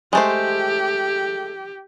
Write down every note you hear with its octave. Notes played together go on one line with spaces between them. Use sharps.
G#3 A3 G4 C5